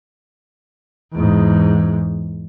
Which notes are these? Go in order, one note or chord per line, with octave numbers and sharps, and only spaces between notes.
E2 G#2